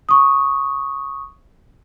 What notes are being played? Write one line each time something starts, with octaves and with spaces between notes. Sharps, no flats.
C#6 D#6